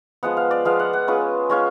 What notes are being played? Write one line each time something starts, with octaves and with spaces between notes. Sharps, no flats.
F3 G#3 B3 F#5
F5
D5
F3 G#3 B3 F5
F#5
F#5
G#3 C#4 F4 B4
G#3 C#4 F4